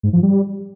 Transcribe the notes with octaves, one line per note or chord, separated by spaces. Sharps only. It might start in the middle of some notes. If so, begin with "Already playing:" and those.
G#2
F3
G3